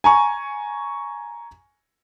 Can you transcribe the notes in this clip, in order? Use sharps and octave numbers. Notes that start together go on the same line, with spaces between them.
G#5 A#5 C#6